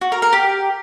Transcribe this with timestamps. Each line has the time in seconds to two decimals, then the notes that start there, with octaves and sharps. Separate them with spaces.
0.01 F#4
0.12 A#4
0.22 A#4
0.33 G4